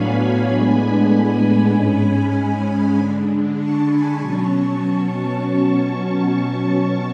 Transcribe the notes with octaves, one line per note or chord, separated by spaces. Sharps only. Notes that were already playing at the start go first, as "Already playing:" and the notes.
Already playing: A2 F#3 B3 D4 C#5 F5 G#5 B5
A2 G#3 B3 D4
G#2 G#3 C#4 G#5 B5
D3 G#3 D4
A5 C#6
G#5 B5
B2 F#3 C#4 A5 C#6